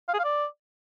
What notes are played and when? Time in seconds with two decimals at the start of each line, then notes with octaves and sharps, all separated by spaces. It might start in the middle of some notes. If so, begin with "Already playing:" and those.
0.09 F5
0.14 G#4
0.19 F5
0.24 D5